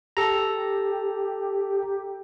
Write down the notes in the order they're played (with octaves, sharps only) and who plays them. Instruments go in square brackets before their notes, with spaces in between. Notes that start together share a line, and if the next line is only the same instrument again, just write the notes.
[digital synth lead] G4 [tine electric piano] A4 A#5